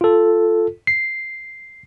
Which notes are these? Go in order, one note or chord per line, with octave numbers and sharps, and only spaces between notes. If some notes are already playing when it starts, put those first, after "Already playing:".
F4 A4
C7